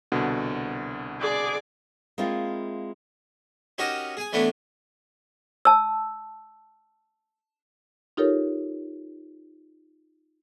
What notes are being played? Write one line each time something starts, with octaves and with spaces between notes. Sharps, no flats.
C2 B2 D3
G#4 D5 D6
G#3 A#3 C4 E4 F4
C#4 D#4 F#4 G4 A#4 D#5
G#4 G#5
E3 A3 B3 C#4 D4
A5 E6
D#4 F4 G4 A4 A#4 C#5